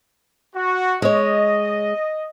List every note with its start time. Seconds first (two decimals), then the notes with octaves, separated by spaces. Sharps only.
0.55 F#4
1.02 G#3 C#5 D#5